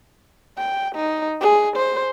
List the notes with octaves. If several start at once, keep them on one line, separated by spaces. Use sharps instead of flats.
G5
D#4
G#4
C5